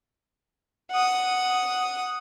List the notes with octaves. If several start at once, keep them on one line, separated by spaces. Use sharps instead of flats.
F#5 D#6